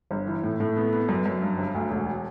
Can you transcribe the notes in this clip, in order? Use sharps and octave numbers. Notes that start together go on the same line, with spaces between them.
G1
E3
A2
A2
B3
B3
F#2
F#2
G2
G1
D2
E1